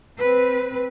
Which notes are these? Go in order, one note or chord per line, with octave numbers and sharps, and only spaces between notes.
C4 B4